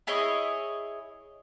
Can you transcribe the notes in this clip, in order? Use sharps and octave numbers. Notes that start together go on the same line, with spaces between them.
E4 G#4 C#5 D#5